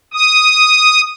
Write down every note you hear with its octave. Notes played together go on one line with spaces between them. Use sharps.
D#6